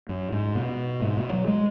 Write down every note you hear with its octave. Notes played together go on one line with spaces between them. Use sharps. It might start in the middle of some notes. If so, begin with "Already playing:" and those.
F#2
G#2
B2
G#2
B2
F#3
G#3